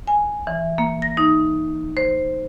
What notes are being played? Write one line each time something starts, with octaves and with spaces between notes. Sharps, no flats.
G#5
E3
A#3
A#6
D#4
C5